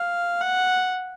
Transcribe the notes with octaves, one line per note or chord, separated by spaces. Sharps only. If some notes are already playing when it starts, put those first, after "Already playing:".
Already playing: F5
F#5